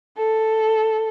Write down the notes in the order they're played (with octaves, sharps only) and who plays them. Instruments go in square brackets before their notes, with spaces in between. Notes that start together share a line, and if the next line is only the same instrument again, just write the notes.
[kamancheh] A4